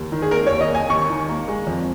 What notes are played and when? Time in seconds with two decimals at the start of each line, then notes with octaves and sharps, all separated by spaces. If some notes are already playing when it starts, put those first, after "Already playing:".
Already playing: D#2
0.12 D#3
0.22 G#4
0.31 A#3 A#4
0.47 C#5
0.51 D#2
0.61 D#5
0.70 A#3 G#5
0.90 D#2 C#6
1.10 D#3
1.29 A#3
1.48 G#3
1.67 F2